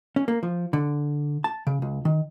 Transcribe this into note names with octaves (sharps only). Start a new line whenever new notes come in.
C#4
A#3
F3
D3
A5
C#3
C#2
D#3